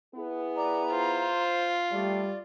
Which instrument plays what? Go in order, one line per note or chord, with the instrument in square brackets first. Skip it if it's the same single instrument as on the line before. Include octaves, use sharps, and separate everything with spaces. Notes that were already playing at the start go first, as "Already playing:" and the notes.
[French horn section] B3 E4 G#4
[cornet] D5 [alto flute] A#5
[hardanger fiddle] F4 [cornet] C5
[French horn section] G3 [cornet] A3 [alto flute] D5